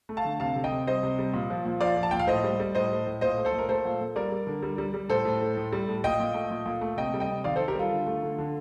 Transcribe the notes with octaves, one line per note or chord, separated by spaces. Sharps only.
A3
F5 A5
D3
C3 F5 A5
C3
D#5 G5
C3
G3 C5 D#5
C3
G3
A#2
F3
A#2
F3 D5 F5
F3
A5
A#2 G5
F5
A2 C5 D#5
G3
G3
A2 C5 D#5
A2
A2
A#2 C5 D#5
A3
A4 C5
A#2
A#4
A3 A4 C5
A#2
A#2
G3 A#4 D5
G3
D3
G3
G3
G3
A2 A4 C5
A2
A2
A2
G3
A2
A#2 D#5 G5
A#2
A3
A#2
A#2
A3
C3 D#5 G5
G3
D#5 G5
C3
D#3 D5 F5
D#3 A4 C5
G4 A#4
G3 F4 A4
D3
A3
D3
D3